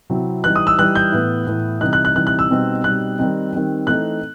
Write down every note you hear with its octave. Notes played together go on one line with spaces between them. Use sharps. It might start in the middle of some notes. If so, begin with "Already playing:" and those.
C3 F#3 C4 E4
E3 G3 D#4 F#6
D#6
E6
E3 G3 D#4 F#6
G6
A2 E3 B3 E4
A2 E3 B3 E4
C3 E3 G3 D#4 F#6
F#6
F#6
C3 E3 G3 D#4 F#6
F#6
E6
B2 G3 C4 D#4
B2 G3 C4 D#4 F#6
D#3 G3 C4 D#4
D#3 G3 C4 D#4
E3 A3 C4 D#4 F#6